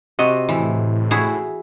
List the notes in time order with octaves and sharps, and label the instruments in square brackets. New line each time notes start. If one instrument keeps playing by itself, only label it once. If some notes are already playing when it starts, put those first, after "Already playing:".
[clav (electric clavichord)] C3 D#5 [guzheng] F#4
[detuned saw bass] A2 [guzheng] E3
[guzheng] E4 F#4 G#4